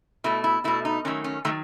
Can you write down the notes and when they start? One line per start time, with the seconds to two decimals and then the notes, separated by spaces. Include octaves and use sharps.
0.24 B2 A3 E4
0.44 E4
0.64 B2 A3 E4
0.85 D#4
1.05 D#3 F#3 A3 C#4
1.24 C#4
1.45 D#3 F#3 A3